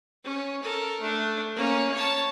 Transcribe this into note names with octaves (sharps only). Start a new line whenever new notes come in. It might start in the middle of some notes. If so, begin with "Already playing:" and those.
C#4
A4 A#4
A3 D4
A#3 C#4
C#5 A5